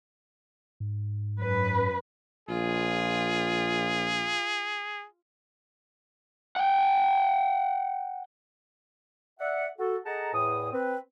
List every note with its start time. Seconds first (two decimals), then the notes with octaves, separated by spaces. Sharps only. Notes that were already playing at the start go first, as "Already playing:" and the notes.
0.80 G#2
1.39 F#2 B4
2.49 A#1 F4 G#4
6.56 F#5 G5
9.40 D5 E5 F#5
9.79 F#4 A4
10.06 G#4 A4 D#5 F#5 A5 A#5
10.34 E2 A2 D#6
10.73 C4 B4